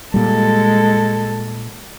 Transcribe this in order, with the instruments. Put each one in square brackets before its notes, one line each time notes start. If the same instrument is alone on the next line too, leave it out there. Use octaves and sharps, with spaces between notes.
[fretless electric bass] A#2 G3 [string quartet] G#3 A4